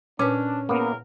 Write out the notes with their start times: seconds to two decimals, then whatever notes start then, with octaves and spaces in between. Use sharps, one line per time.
0.19 A#2 C#4 D4 B4
0.69 E2 C#3 A#3 B3 A#4